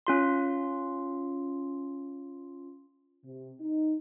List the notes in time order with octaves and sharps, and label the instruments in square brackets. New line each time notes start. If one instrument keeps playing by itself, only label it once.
[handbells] C#4 F4 C6
[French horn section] C3
D#4